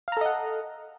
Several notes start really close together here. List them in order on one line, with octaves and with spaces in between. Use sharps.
F5 A#5 A4 D#5 F#5